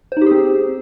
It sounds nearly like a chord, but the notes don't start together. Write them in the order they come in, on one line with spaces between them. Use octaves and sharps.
C5 D#4 G4 G#4 C4